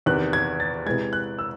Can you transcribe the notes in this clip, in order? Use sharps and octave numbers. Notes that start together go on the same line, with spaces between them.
E2 C3 D#3 F#6
G#6
A6
C3 E3 G#3 G#6
F#6
E6